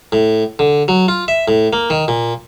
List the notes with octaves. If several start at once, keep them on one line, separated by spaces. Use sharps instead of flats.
A2
D3
F#3
F4
E5
A2
A#3
D#3
A#2